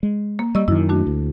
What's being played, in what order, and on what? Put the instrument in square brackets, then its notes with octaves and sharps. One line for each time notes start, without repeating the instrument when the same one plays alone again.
[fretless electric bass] G#3
[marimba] A#3
[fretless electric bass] G3 [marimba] D#5 C#6 E6
[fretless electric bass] F#2 D#3 [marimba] E4
[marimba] A3 D4 F#4
[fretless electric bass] D2